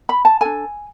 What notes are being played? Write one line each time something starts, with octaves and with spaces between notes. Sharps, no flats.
B5
A5
D4 A4 G#5